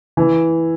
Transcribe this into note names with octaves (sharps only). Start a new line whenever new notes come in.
E3